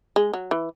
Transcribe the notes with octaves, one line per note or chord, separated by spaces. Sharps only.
G#3
F#3
E3